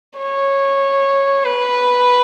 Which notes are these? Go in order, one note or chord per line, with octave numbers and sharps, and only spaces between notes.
C#5
B4